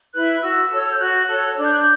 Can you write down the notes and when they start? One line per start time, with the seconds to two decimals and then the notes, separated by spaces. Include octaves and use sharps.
0.14 E4 B4 F#6
0.42 F#4 E6
0.70 A4 C#5
0.92 G6
0.99 F#4 F#6
1.28 A4 C#5
1.57 D4
1.65 G6
1.73 F#6
1.80 G6